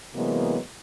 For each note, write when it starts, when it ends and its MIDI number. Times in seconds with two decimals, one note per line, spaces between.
0.14 0.58 48
0.14 0.58 52
0.14 0.58 54
0.14 0.58 56
0.14 0.58 58
0.14 0.58 59